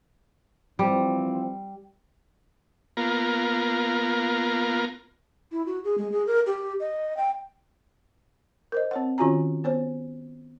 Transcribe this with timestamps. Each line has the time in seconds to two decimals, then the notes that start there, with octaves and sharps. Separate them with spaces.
0.79 E3 F3 G3 C4
2.97 A#3 B3 F4 A#4
5.52 E4
5.66 F#4
5.84 G#4
5.98 G#3
6.12 G#4
6.27 A#4
6.46 G4
6.80 D#5
7.17 G5
8.72 A#4 C5 D#5
8.91 C4 C#5 F#5
9.18 D#3 C#4 F4 F#4 G#5 A#5
9.64 B3 C5 C#5